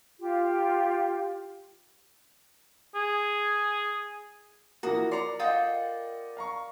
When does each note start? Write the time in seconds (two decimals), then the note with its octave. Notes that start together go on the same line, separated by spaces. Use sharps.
0.19 F4 G4
2.95 G#4
4.83 E3 F3 A#3 F#4 A#4 D#6
5.11 D5 A#5 C6 C#7
5.40 F4 A4 D#5 F#5 G5 D#6
6.37 F5 A#5 C#6